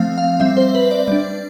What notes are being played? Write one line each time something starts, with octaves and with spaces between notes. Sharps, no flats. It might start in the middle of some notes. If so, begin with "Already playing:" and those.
Already playing: F3 A3 C4 F5
F5
G3 C4 E5
C5
B4
D5
G3 D4 D5